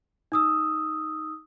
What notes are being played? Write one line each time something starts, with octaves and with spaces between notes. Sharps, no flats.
D#4 D#6 E6